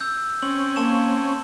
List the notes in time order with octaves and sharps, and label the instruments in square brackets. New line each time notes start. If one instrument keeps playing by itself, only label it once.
[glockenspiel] E6 G6
[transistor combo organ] C4 C#4 [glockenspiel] F#7
[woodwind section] A#3 [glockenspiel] A5 C#6 E7